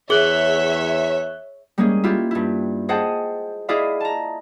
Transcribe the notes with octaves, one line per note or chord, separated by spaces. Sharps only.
E2 G#4 C#5 E5 F#6 F#7 G7
G3 G#3 A#3 C#4 G#4
E4 F4 G4
G2 E4
G#4 C5 D#5 F#5 G5 A5
E4 G#4 D5 D#5 F5 B5
A5 A#5